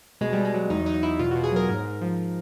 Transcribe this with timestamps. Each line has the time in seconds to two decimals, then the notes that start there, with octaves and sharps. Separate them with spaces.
0.21 B2 G#3
0.33 B2 G3
0.45 G#3
0.54 F#3
0.70 E2 D#4
0.86 F#3 D#4
1.03 E2 E4
1.19 B2 F4
1.31 B2 F#4
1.44 G#4
1.52 F#3 A#4
1.69 G#2 A#4
1.85 G#2
2.01 F3